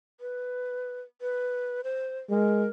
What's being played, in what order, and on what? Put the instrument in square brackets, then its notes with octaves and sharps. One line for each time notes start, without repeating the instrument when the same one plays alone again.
[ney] B4
B4
C5
[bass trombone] G#3 [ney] A#4